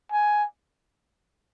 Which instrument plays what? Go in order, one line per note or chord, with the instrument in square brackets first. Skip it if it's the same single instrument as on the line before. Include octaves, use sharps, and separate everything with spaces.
[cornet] G#5